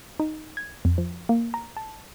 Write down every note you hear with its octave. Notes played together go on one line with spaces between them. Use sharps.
D#4
G#6
F2
F3
A#3
A#5
A5